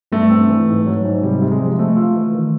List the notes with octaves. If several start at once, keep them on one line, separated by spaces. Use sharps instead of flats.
G2 A3
C4
E3
G#2
F#3
G#2
C3 G3
C3
G#3
F3
G#3 A3
F4
E3
D#3